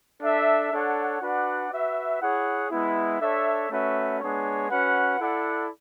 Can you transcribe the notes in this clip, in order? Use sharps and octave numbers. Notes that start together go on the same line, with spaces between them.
D4 A4 E5
D4 A4 C#5 F#5
D4 F#4 B4 D5 F#5
F#4 B4 E5
E4 G#4 C#5 F#5
G#3 B3 E4
D4 A4 C#5 E5
A3 C#4 F#4 B4 E5
G#3 B3 D4 G#4 C#5
C#4 F#4 B4 F#5
E4 A4 D5 F#5